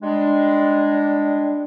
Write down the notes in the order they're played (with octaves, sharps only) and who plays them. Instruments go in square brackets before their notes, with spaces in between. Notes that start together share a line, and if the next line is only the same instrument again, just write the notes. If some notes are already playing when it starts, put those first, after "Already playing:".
[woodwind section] G3 G#3 D4